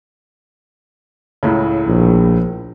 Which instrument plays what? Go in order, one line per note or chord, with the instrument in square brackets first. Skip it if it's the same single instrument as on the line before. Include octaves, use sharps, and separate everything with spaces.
[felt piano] C#2 A2 C#3
[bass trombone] A#1